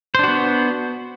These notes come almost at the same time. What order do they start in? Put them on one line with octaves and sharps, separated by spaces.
C5 D4 F#4 B3